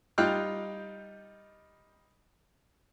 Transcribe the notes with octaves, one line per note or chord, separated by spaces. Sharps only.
G3 D#4 F4 G5 F6 F#6